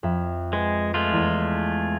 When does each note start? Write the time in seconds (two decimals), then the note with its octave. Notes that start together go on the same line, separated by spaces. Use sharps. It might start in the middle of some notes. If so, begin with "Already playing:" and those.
0.03 F2 E5
0.53 G#3 B4
0.94 G#3 A3 F4
1.12 E2 B6 D#7